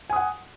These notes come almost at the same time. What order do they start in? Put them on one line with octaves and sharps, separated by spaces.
G#5 D#6 F#5